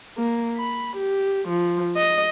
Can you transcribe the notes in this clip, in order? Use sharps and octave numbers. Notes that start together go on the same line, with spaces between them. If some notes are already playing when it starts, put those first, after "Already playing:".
A#3
B5
G4
F3
D#5